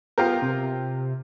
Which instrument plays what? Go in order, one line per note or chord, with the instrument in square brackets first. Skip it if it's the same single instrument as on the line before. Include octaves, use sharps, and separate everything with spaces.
[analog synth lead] B3 [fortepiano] F4 G4 A#4
[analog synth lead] C3